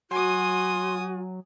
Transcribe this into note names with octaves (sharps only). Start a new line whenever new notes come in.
F#3 F#4 G#5 C6 D#6